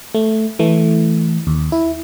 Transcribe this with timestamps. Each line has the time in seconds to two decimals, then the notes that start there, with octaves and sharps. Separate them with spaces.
0.15 A3
0.59 E3 A3
1.47 D#2
1.72 E4